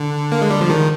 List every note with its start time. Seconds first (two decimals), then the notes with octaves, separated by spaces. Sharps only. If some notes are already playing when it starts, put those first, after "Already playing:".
Already playing: D3
0.32 A#3
0.41 G#3
0.50 G3
0.61 F3
0.70 D#3